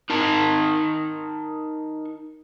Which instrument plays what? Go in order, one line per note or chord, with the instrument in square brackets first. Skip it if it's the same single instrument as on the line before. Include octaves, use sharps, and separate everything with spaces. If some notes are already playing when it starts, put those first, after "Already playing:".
[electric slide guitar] D#4 A#4 A5